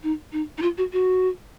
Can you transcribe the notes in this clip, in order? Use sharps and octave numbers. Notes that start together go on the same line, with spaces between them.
D#4
D#4
D#4
F4
F#4
F#4